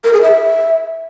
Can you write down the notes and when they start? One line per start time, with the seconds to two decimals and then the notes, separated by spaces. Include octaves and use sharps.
0.04 A#4
0.13 G#4
0.22 E5